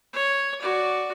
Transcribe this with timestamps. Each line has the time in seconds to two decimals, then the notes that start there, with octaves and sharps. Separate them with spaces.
0.13 C#5
0.61 F#4 D5